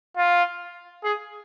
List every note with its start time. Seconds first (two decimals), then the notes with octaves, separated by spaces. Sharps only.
0.17 F4
1.04 G#4